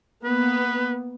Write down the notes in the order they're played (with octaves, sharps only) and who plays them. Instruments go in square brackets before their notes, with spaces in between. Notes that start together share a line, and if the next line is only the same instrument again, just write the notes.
[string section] A#3 B3 [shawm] B4